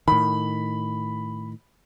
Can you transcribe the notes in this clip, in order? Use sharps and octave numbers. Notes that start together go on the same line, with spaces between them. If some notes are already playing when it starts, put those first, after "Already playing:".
A2 D#3 B5